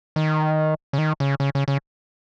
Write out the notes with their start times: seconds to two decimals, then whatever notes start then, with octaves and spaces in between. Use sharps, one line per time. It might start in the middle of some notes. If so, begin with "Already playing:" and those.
0.16 D#3
0.93 C#3
0.98 D#3
1.20 C#3
1.40 C#3
1.55 C#3
1.68 C#3